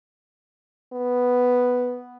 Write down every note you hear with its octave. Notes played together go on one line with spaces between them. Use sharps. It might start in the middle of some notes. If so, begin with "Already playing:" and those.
B3